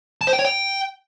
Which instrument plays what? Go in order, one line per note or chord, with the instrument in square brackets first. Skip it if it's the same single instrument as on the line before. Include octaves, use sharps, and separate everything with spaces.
[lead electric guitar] A5
C5
G5
C#5
G5